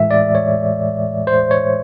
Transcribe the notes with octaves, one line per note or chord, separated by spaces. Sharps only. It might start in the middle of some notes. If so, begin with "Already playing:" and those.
Already playing: A2 E3 G#3 E5
D5
C#5
C5
C#5